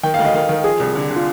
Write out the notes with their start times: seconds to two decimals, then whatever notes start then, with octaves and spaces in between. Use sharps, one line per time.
0.03 D#3 G5
0.14 D2 F5
0.25 D#5
0.34 D#3 F5
0.49 D#3
0.64 F3 G#4
0.80 C2
0.95 D3
1.11 D3
1.16 F4